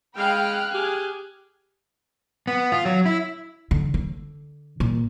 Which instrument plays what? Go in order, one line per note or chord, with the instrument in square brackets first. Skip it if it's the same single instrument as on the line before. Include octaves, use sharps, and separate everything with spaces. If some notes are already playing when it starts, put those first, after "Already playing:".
[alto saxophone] G#3 [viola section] F5 G5 B5 [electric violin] F6 F#6
[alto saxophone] G4 [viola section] G#4 G#5
[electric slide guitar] B3
F4
F#3
E4
[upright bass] D3
D3
A#2